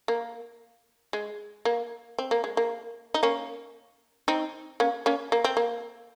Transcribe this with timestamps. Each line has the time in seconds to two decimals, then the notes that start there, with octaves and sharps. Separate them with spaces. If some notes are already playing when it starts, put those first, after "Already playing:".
0.08 A#3
1.13 G#3
1.65 A#3
2.19 C4
2.31 A#3
2.44 G#3
2.57 A#3
3.14 D#4
3.23 A#3 C#4
4.28 C4 D#4
4.80 A#3 C#4
5.06 A#3 C#4
5.32 A#3
5.44 C4
5.57 A#3